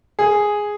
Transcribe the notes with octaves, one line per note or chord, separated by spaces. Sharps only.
G#4